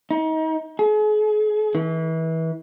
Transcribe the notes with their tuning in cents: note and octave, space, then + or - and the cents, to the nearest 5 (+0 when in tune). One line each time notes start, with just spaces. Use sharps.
D#4 +35
G#4 +40
E3 -30